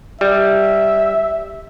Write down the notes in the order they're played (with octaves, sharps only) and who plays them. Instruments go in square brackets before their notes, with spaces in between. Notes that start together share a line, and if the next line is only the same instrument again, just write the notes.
[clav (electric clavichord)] G3 [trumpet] E5